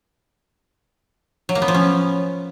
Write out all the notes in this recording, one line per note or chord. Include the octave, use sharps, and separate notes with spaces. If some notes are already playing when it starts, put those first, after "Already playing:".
F#3
A#3
B3
F3
C#4